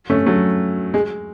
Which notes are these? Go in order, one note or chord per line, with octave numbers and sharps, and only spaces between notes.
A3 C#4
F#3 A3
G#3